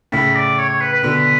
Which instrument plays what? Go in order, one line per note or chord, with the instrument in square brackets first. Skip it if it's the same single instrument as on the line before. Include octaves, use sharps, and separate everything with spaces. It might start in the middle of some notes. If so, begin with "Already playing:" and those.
[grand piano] A2 C#3 [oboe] B5
[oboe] D5
C#5
C#5
B4
B4
[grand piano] B2 D3 [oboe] B4